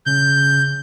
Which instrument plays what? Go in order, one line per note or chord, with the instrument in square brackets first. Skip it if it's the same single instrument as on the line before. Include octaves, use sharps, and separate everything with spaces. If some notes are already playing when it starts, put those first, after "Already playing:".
[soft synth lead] C#3 [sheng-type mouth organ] G6